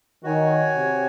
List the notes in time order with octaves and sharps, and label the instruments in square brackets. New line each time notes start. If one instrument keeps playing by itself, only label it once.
[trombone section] D#3 [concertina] F#4 C#5 G#5
[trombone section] C3